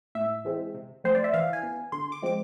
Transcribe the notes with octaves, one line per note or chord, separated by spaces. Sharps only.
A2 E5
E3 G#3 C4
C3
F3 A3 C4 C5
D5
E5
E3 F5
G#5
B3
D3 C6
D6
F3 G#3 C4 D6